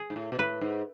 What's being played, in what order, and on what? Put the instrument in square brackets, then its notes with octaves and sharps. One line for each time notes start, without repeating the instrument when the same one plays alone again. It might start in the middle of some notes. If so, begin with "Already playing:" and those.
Already playing: [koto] G#4
[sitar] G#2
A2
B2
[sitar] A2 [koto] B4
[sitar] G#2